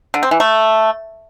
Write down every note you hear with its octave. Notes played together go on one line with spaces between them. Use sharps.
D3
C4
E3
A3